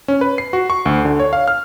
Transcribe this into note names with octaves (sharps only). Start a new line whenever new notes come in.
C#4
B4
C7
F#4
C#6
D2
D3
C#5
F5
F6